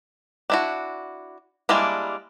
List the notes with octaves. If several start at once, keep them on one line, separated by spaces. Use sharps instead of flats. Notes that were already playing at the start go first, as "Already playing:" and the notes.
D4 E4 F#4
G3 G#3 A#3 D4 E4